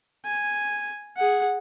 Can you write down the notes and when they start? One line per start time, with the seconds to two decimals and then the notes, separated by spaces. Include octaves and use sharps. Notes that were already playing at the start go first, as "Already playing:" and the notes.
0.25 G#5
1.17 G#4 F#5